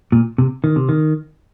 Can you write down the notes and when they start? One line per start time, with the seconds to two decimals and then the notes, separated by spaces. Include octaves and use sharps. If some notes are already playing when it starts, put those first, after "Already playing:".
0.12 A#2
0.38 C3
0.64 D#3
0.76 C3
0.89 D#3